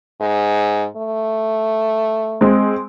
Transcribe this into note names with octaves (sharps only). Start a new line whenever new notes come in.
G#2
A3
G#3 C4